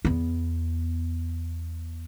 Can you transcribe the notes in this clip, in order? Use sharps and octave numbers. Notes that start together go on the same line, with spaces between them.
E2 B3